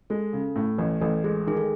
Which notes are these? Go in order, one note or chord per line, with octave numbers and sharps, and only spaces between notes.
G#3 A4
C#3
A2
A1
A1 A4
G#3 G#4
D#3 G#4
A4